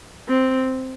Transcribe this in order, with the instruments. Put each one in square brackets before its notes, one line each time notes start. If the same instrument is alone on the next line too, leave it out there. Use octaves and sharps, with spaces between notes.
[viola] C4